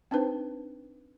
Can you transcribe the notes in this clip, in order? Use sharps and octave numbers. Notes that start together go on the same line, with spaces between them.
C4 D4 D#4 B4 C5